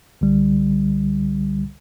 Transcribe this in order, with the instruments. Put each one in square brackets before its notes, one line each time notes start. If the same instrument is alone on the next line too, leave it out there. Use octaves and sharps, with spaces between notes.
[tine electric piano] C2 D3 G3